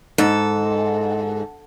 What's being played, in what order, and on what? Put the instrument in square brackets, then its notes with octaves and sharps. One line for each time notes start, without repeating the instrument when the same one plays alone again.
[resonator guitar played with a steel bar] G#2 [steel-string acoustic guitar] A4